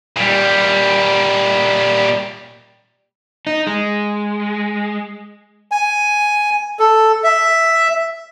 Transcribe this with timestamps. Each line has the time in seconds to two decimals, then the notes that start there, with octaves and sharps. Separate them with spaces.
0.17 A#2 G3
3.47 D#4
3.67 G#3
5.71 G#5
6.79 A4
7.24 E5